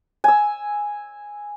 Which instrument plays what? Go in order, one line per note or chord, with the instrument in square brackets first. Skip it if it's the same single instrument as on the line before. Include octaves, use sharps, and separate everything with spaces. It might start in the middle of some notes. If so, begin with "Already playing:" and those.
[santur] G#5 E6